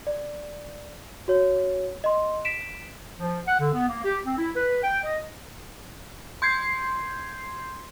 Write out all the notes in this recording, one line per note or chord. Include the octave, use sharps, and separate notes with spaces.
D5
F#4 C#5
D#5 C6
B6 D7 E7
F3
F#5
D3
B3
A#3
G4
C4
E4
B4
G5
D#5
C6 G6 G#6 C7